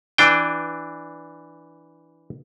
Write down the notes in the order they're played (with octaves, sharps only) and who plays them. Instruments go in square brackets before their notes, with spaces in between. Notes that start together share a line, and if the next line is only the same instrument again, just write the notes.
[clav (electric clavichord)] E3 D4 G5